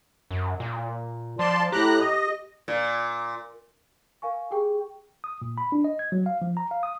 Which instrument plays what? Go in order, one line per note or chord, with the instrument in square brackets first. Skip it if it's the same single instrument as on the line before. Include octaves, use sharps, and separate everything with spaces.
[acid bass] F#2
A#2
[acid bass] F3 [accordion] D5 A5 C6
[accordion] A2 A#5 F#6 [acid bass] G4
[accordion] D#5
[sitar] A#2
[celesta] A#4 F5 G#5 C#6
G4 G#4 G5 C#6
[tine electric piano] D#6
A#2
B5
D4
D#5
G#6
F#3
F5
F3
A#5
F5
D#6